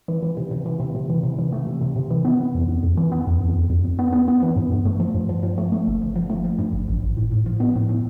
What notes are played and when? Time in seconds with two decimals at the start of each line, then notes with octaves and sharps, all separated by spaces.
0.08 E3
0.23 E3
0.37 C3
0.51 C3
0.66 E3
0.80 C3
0.95 C3
1.10 E3
1.23 C3
1.39 E3
1.52 A3
1.67 C3
1.81 C3
1.96 C3
2.10 E3
2.25 B3
2.39 E3
2.54 F2
2.69 F2
2.83 F2
2.97 E3
3.12 B3
3.27 F2
3.41 F2
3.55 F2
3.70 F2
3.85 F2
3.99 B3
4.13 B3
4.28 B3
4.43 E3
4.56 G2
4.72 G2
4.85 A3
5.00 F3
5.14 G2
5.29 F3
5.43 F3
5.58 A3
5.72 A3
5.87 G1
6.01 G1
6.16 F3
6.30 A3
6.44 F3
6.58 G2
6.73 G1
6.88 A1
7.03 A1
7.17 A2
7.31 A2
7.46 F3
7.60 B3
7.75 A2
7.89 A2